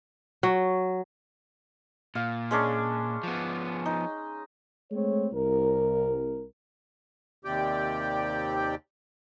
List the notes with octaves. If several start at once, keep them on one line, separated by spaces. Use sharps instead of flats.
F#3
A#2 F5
G#3 C#4 D4
F3 B3
D#4
G#3 A3 C4 C#5
C2 A#4
D#2 C3 G4 D5 G5